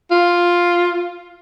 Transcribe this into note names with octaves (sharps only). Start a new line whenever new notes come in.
F4